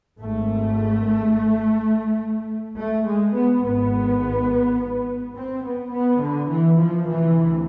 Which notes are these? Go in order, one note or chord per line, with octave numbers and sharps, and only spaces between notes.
G#1 G#2 A3
A3
G#3
B3
G#1 G#2 B3
C4
B3
B3
D3
E3
F3
D2 C3 E3